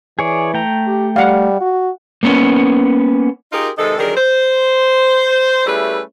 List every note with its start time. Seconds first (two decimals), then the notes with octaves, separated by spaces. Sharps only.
0.19 E3 G#4 C#5 D5
0.54 A3 G5 A#5
0.87 G4
1.16 G3 F5 F#5
1.61 F#4
2.23 A#3 B3 C#4
3.53 D#4 F4 G4 G#4 A#4
3.78 C3 D#3 G#3 D#4 A4
3.98 D3 D#3 F#3 G3 G#4 A#4
4.16 C5
5.66 G3 A3 C#4 E4 G#4 B4